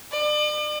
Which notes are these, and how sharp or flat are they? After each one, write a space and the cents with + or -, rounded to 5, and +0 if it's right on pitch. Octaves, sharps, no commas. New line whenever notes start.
D5 +40